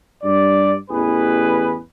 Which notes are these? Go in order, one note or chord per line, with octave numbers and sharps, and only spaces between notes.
G2 D5
A1 E2 G#4 B4